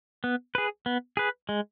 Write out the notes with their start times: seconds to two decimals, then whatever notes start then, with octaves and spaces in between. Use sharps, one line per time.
0.24 B3
0.55 G#4 B4
0.86 B3
1.17 G#4 B4
1.49 G#3